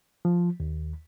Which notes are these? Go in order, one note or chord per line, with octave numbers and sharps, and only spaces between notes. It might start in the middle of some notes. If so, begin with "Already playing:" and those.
F3
D#2